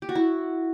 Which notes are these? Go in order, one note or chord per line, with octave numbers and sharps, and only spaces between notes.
G4
F#4
E4